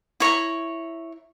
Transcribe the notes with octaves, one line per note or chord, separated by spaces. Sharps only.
E4 C#5 A#5 C#6